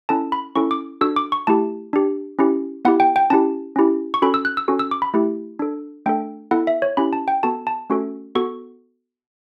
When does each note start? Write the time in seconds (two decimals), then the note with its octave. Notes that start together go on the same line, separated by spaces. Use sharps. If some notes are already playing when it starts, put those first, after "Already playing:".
0.09 C#4 E4 A4 A5
0.32 B5
0.56 C#4 E4 A4 C#6
0.71 D6
1.01 D4 F#4 A4 E6
1.16 D6
1.32 C#6
1.47 A3 E4 G4 A5
1.93 D4 G4
2.39 C#4 E4 G4
2.85 B3 E4 G4 F#5
3.00 G5
3.16 G5
3.30 C#4 E4 G4 A5
3.76 C#4 E4 G4
4.14 C#6
4.22 C#4 F#4 A4 B5
4.34 E6
4.45 F#6
4.57 E6
4.68 C#4 F#4 A4
4.79 E6
4.91 D6
5.02 B5
5.14 A3 E4 G4
5.59 D4 A4
6.06 A3 D4 A4 G5
6.51 B3 E4 A4 F#5
6.67 E5
6.82 C#5
6.97 C#4 E4 G4 B5
7.13 A5
7.28 G5
7.43 B3 F#4 A4 A5
7.67 A5
7.90 A3 C#4 F#4 A4
8.35 B3 F#4 A4 C#6